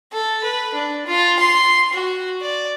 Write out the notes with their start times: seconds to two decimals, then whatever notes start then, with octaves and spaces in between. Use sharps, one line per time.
0.12 A4
0.44 B4
0.74 D4
1.07 F4
1.39 C6
1.93 F#4
2.41 D5